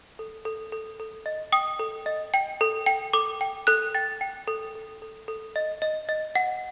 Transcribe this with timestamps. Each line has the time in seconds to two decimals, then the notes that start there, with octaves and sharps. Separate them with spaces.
0.19 A4
0.45 A4
0.72 A4
1.00 A4
1.26 D#5
1.52 G5 D#6
1.79 A4
2.06 D#5
2.34 G5
2.61 A4
2.86 G5
3.13 A4 D6
3.41 G5
3.67 A4 F#6
3.94 G5 A6
4.21 G5
4.48 A4
4.75 A4
5.02 A4
5.28 A4
5.56 D#5
5.82 D#5
6.09 D#5
6.36 F#5